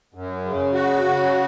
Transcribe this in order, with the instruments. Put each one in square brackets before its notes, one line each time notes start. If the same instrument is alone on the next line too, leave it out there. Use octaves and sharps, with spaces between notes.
[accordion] F#2
C#3
F#4
C#3